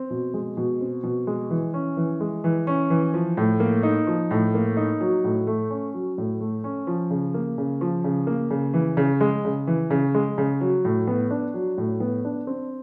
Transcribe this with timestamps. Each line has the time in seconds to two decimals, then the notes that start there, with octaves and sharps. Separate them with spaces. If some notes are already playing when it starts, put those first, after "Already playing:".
Already playing: C4
0.10 B2
0.34 G#3
0.57 B2
0.81 C4
1.03 B2
1.27 G#3
1.50 E3
1.74 C#4
1.97 E3
2.20 G#3
2.44 E3
2.67 C#4
2.90 E3
3.14 F3
3.37 A2
3.60 A#3
3.83 D#4
4.07 F3
4.31 A2
4.54 A#3
4.77 D#4
5.01 F#3
5.24 A2
5.47 A3
5.70 C#4
5.94 F#3
6.18 A2
6.40 A3
6.64 C#4
6.87 F3
7.11 C#3
7.34 A#3
7.58 C#3
7.81 F3
8.04 C#3
8.27 A#3
8.50 C#3
8.74 E3
8.97 C#3
9.21 G#3
9.45 C#3
9.67 E3
9.91 C#3
10.14 G#3
10.38 C#3
10.61 F#3
10.85 A2
11.07 B3
11.31 D4
11.54 F#3
11.78 A2
12.00 B3
12.25 D4
12.47 C4